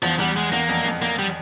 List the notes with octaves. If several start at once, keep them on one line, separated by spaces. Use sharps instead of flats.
E2 F3
E2 G3
G#3
E2 A#3
F2
F2
A#3
G3